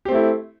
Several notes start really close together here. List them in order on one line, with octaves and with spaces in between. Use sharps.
G4 C4 A3 E4